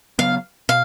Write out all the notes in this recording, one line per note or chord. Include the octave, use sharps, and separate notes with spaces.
C#3 F#3 B3 F5
B2 F5